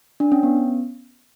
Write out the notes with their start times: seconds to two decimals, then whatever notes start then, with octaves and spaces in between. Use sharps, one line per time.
0.20 D4
0.32 C#4
0.43 B3